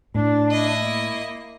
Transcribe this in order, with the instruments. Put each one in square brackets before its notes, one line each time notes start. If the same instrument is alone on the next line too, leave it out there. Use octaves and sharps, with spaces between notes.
[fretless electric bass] A2 [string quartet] D4
[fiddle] E4 D#5
[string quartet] A#3